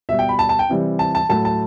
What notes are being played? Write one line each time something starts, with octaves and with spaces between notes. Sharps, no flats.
B2 G3 E5
G5
B5
A5
A5
G5
C3 E3 G3
A5
A5
A2 F#3 A3 A5
A5